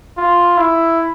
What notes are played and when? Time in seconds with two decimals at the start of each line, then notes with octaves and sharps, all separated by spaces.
0.17 F4
0.57 E4